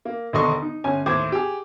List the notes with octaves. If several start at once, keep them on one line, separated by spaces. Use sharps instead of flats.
A#3
E1 D#2 D3 D#5 C6 C#6
D#4
G1 C#4 G#5
D#2 A2 C5 D6 G#6
G4 G#4